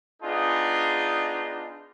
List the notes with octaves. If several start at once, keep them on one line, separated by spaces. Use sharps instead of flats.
B3 D4 D#4 F4 G#4